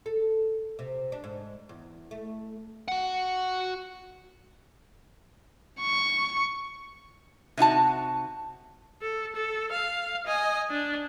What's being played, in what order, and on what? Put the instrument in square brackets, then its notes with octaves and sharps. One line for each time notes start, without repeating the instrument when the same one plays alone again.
[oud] A4
C3
D4
G#2
E2
A3
[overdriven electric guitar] F#4 F#5
[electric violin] C#6
[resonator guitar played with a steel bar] C3 D#4 F#4 A5
[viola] A4
A4
F5
D#5 G#5
D4